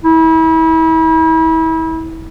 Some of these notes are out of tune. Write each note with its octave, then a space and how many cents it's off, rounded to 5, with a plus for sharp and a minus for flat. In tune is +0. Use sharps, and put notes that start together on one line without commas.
E4 -35